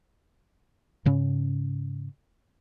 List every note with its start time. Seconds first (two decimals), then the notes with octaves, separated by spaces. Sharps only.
1.06 G#2 C#3 C#4